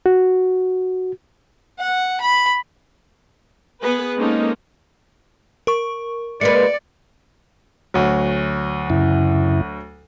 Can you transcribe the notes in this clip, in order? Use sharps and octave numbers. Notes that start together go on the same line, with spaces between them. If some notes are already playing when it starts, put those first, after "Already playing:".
F#4
F#5
B5
B3 G#4 B4
G#3 A#3 C4 C#4 D#4 A4
A#4 C#6
G#3 A#3 B4 D5 C#7
D2 F#3
F#2 C#3 E4